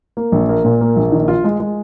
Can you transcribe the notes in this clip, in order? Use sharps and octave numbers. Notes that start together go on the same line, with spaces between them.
A#3
A#1
A#3
A#2
A#3
A#1
D#3
F4
G#3
G#3